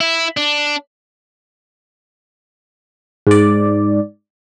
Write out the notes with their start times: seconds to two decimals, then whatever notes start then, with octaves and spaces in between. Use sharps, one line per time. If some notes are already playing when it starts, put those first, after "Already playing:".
0.01 E4
0.37 D4
3.27 G#2 D5